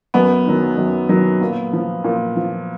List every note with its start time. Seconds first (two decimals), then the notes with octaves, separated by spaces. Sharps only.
0.14 F#2 B3
0.46 D#3 F#3
0.78 F#2
1.09 D#3 F#3
1.41 A#2
1.73 F3
2.04 A#2
2.36 F3